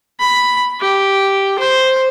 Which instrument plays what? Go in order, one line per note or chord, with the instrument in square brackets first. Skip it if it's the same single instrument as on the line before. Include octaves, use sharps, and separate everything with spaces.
[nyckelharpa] B5
G4
C5